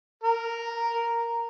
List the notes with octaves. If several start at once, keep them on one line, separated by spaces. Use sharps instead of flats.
A#4